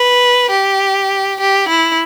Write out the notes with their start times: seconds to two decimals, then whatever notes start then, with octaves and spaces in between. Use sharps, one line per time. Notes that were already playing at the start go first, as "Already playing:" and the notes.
Already playing: B4
0.51 G4
1.40 G4
1.69 E4